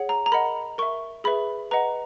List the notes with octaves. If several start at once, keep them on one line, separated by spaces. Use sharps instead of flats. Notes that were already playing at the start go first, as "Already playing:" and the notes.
Already playing: G#4 C#5 F#5
A#5
A#5
A#4 D#5 F#5 B5
A#4 E5 C#6
G#4 B4 E5 B5
B4 D#5 F#5 A#5